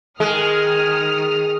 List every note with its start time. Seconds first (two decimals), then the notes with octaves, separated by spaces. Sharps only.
0.20 D#3 G#3 D#6 F6